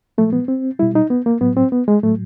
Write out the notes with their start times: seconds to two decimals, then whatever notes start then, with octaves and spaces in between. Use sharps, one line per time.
0.18 A#2 F3 G#3 A3
0.33 B3
0.48 C4
0.79 B2 G3 E4
0.95 D#4
1.10 B3
1.26 A#3
1.41 A2 F#3 B3
1.57 C4
1.72 B3
1.88 G#3
2.03 A2 F#3 A3